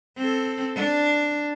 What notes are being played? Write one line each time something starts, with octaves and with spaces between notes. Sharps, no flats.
C4 A4
D4